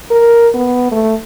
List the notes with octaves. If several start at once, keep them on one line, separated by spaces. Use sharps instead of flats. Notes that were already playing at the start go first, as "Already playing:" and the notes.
A#4
B3
A3